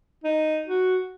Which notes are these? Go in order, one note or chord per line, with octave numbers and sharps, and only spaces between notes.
D#4
F#4